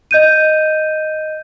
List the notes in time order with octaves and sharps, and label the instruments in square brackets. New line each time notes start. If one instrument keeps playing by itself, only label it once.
[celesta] D#5 G6 D#7